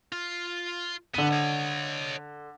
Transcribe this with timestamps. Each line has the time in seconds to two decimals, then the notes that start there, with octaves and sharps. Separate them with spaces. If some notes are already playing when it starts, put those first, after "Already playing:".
0.12 F4
1.14 D3 B3 D#7
1.31 C#5 D#5